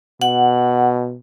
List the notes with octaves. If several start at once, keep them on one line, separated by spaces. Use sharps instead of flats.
B2 F#5